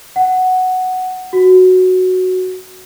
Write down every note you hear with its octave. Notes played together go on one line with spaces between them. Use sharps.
F#5
F#4